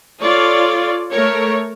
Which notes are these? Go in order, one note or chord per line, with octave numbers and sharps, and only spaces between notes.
F4 A4 C#5 D5
A3 A#4 C#5